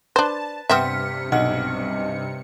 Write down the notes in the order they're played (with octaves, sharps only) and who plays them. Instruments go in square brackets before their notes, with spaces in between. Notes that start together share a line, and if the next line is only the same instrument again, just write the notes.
[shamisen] D4 C5 [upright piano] B4 [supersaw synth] A5
[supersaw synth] G2 C3 C#7 [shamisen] B3 C4 E5 [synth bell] F6 B6
[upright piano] B1 F#5 [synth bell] D#5 F6